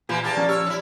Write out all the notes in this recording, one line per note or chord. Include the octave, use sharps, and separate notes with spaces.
A#2 E3 A#3 F4 G4 G#6
E2 A#3 G4 A5
F3 C#4 A#5
G4 C#5 E6 F6
D4 E4